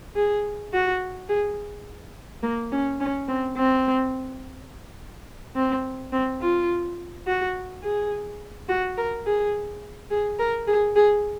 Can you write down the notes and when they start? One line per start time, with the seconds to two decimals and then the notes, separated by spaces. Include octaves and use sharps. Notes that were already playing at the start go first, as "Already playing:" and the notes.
0.16 G#4
0.73 F#4
1.29 G#4
2.43 A#3
2.72 C#4
3.00 C#4
3.28 C4
3.57 C4
5.56 C4
6.12 C4
6.41 F4
7.27 F#4
7.83 G#4
8.68 F#4
8.97 A#4
9.26 G#4
10.10 G#4
10.39 A#4
10.67 G#4
10.96 G#4